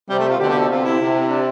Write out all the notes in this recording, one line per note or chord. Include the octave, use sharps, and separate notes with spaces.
C3 G3
A3
F4
B2 D3 G4
G4
A4
C3 F4
E4
C3
D4